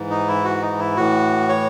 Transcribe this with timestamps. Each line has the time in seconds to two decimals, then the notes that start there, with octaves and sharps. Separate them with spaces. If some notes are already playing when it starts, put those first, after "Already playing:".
Already playing: G#2 E3
0.10 D#4
0.28 E4
0.44 F#4
0.62 D#4
0.79 E4
0.96 A2 E3 F#4
1.49 C#5